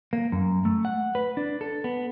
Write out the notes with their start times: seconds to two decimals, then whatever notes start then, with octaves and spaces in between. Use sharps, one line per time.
0.13 A#3
0.32 F#2
0.65 A3
0.85 F#5
1.15 B4
1.37 D4
1.61 A4
1.84 B3